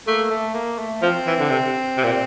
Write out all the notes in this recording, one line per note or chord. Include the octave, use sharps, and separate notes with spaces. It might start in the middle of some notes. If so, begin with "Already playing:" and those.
A3 A#3
A3
A#3
A3
F3 C4
E3
D3
C3
C3
A#2